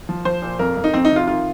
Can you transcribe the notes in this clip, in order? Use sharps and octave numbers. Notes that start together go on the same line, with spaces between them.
F3
F3 C5
A#2
F2 A#4
F2
D#4
F2 C4
D#4
C3
F4
D#3 F4